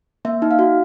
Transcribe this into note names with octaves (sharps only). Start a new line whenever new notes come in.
A#3 E5
D#4
F5
F#4